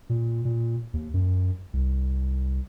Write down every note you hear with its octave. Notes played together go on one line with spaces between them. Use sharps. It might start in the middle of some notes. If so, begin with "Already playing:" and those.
A#2
A#2
D#2
F#2
C2